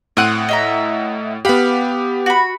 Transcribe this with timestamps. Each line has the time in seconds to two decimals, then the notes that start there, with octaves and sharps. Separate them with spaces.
0.17 A2 C4 F#5 D#6 F#6
0.49 D#5 E5 A#5
1.45 B3 G4 F5 F#5 B5
2.26 F#4 B5